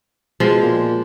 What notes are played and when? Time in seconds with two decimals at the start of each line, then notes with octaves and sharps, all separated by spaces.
0.40 B2 F3 G#3
0.62 A#2